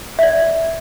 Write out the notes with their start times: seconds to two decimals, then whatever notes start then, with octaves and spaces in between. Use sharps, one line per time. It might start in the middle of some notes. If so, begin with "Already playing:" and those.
0.19 E5
0.23 D5